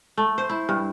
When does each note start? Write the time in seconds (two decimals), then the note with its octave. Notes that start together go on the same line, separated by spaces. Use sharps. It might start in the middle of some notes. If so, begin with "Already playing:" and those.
0.17 A3
0.38 C5
0.50 E4
0.69 G2